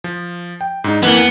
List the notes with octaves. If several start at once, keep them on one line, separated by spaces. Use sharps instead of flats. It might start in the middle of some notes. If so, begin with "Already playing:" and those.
F3
G5
G#2 D4 D#4
F2 E3 A#3 B3